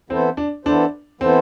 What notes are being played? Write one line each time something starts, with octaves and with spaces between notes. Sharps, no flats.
E3 B3 C4 E4 A4 C5
D4
E3 B3 D4 E4 A4 C5
E3 B3 C4 E4 A4 C5